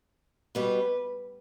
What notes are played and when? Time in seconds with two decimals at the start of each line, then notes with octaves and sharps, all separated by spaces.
0.55 B2 G3 B4